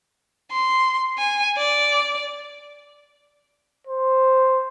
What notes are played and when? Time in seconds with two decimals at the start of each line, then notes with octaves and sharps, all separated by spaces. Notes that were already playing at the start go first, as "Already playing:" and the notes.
0.51 C6
1.18 G#5
1.57 D5
3.87 C5